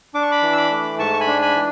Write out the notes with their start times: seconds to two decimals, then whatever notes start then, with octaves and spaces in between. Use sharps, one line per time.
0.15 D4 D6
0.23 C#6
0.31 B5 D6
0.43 E3
0.53 E6
0.57 B5 D6
0.71 A3
0.99 G#2 A5 C#6
1.14 C#6
1.20 G#5 B5
1.27 D4
1.42 G#5 B5
1.55 E3